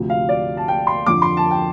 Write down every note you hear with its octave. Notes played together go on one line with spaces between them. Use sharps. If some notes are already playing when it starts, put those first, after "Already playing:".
Already playing: D2 C3 F3
F5
D5
A5
G5
C6
F2 D3 F3 D6
C6
A5
G5